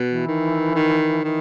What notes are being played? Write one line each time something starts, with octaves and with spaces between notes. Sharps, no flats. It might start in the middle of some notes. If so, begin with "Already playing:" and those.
Already playing: B2
E3
D#3
D#3
D#3 E3